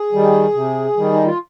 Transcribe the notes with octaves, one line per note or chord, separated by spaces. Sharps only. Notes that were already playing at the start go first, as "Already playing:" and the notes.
Already playing: G#4
D#3 G3
C3
D#3 G3
D#4
F4